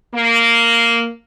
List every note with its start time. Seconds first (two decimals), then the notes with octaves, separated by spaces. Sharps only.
0.14 A#3